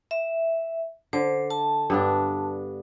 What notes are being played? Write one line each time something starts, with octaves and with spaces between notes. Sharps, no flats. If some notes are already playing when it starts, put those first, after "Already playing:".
E5
D3 C5
A5
G2 B3 D4